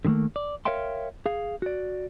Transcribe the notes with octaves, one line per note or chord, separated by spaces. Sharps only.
D3 D#3 F3 A3 A#3
D5
A#4 C#5 E5 F5 G5 C6
G#4 F5
F#4 D5